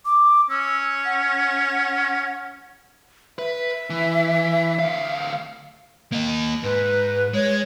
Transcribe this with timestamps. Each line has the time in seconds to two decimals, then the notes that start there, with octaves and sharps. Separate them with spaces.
0.05 D6
0.50 C#4 E6
1.05 F#5
3.38 B4 E5
3.90 E3
4.79 D2 F5
6.12 A#3 D#5
6.64 G#2 B4
7.34 G#3 C#5